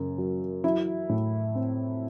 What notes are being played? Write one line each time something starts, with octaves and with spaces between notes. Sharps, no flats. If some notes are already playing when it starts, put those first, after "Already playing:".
Already playing: F#2 C#3 A#3
F#3
F#3 E4
A2
C4